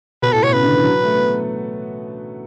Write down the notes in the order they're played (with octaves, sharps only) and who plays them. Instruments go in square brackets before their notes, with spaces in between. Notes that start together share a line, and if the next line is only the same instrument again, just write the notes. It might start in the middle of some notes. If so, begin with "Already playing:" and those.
[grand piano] B2 [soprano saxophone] B4
[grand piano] A2 [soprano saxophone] A4
[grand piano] B2 [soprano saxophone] C#5
[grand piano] C#3 [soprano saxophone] B4
[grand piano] D3
E3
F#3
A3
B3